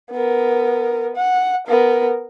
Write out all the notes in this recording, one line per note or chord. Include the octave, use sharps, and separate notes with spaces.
B3 A#4
F#5
B3 A#4